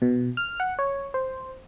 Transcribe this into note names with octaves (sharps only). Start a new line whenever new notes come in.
B2
F6
F#5
C#5
C5